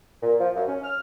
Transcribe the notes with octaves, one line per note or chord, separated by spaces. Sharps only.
A#2
F3
F#2
C#4
F6